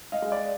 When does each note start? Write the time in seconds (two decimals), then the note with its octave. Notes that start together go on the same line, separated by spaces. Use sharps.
0.12 D#5 F5
0.22 G#3
0.32 D5